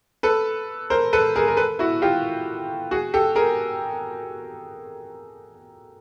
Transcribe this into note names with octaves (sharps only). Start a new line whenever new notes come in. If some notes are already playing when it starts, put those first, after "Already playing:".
A4 B4
A#4 C5
A4 B4
G#4 A#4
A#4
A4 B4
E4 F#4
F4 G4
F#4 G#4
G4 A4
G#4 A#4